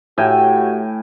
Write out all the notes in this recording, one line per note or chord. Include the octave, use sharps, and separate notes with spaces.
A2 F#4 G4 G5 G#5